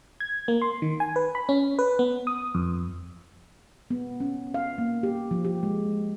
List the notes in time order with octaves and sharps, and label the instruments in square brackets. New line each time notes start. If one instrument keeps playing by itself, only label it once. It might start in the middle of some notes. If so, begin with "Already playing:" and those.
[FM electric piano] G#6
A#3
C6
D#3
G#5
B4
B5
C#4
B4
B3
D#6
F2
[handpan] B3
C#4
F5
A#3
G4
F3
G4
G#3